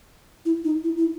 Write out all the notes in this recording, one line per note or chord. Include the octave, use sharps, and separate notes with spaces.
E4
D#4
E4
E4